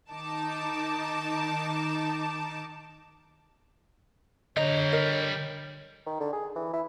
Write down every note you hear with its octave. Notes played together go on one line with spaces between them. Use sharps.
D#3 D#4 A5 D6
D3 G3 C#5 D#5 A#5
A#4 D#5
D#3
D3
G#4
E3
E4